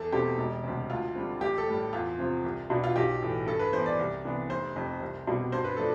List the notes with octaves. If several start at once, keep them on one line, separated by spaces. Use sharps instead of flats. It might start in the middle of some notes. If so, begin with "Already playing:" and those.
Already playing: E2 A4
B2 A3 C4 G4
E1
D2 C3
D2 F4
D3 G3 C4
A1 G4
A4
A2 G3
E2 F4
C3 F3 C4
C2
B2 B3 D4
F4
B1 G4
A2 E3 A3
G2 A4
B4
E3 B3 C5
D5
C2
C3 E3 B3 D4
F1 C5
F2 C3
C2
B2 G3 C4
G2 C5
B4
F3 A3 D4 A4